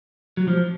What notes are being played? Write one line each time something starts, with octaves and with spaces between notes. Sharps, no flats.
F#3
F3